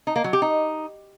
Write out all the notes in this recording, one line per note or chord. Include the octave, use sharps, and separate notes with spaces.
D#4
A#3
F#3
G4
D#4